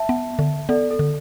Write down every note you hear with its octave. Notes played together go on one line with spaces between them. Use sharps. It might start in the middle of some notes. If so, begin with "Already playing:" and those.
Already playing: E5 A5
B3
D3
B3 A4 D5
A4
D3